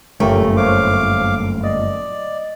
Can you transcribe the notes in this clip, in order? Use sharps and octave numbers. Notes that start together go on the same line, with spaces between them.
G1 F#2 A#2 A3 G4 A#4 C#5
C5 C#5 F5 D6
D5 D#5